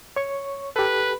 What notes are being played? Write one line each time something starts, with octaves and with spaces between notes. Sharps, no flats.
C#5 C#6
G4 A4 B4